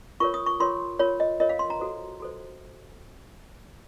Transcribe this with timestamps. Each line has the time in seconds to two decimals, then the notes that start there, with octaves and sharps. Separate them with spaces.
0.20 F4 A#4 C#5 C#6
0.34 D#6
0.46 C#6
0.60 F4 A#4 C#5 C6
0.99 F4 A#4 C#5
1.20 D#5
1.40 F4 A#4 C#5 D#5
1.49 F5
1.59 C6
1.70 A#5
1.80 F#4 A4 C5
2.20 F#4 A4 C5